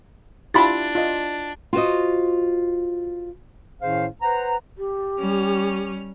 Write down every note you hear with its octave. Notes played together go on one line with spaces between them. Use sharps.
D4 E4 F4 G4 B5 C6 A6
F4 D#5
F4 F#4 C5 D#5
A2 D#3 C#4 G#4 C5 F5
B4 C5 F#5 A#5
G4
G3 C#4 F6